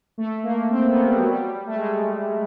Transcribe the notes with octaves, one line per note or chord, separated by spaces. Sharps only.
A3
A#3
C4
B3
G3
F#3
G3
A3
G#3